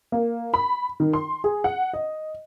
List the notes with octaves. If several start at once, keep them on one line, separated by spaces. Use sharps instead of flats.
A#3
B5
D#3
C6
G#4
F#5
D#5